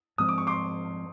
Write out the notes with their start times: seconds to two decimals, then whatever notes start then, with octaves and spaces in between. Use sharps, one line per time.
0.18 G#2 F3 G#3 C4 D#6
0.29 D6
0.38 C#6
0.47 C6 D6